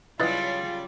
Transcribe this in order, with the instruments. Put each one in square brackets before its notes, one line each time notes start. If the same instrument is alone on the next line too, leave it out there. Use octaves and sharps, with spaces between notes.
[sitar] C#3 F#3 G3 [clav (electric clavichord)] E4 B4 D#5 [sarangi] F4 [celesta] A6